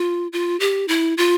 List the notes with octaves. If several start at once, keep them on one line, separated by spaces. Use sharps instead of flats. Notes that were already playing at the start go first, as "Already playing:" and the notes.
Already playing: F4
F4
G4
E4
F4